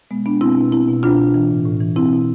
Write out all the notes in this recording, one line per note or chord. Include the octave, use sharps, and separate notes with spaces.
B2 G#3 B3
B2 B3 D4
B2 C4 E4
B2
B2 C4 E4
B2
B2 D4 F4
B2
E3
A2
A2
E3
B2 C4 E4
B2